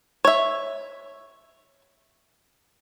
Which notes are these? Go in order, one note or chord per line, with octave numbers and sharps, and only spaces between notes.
C#5 E5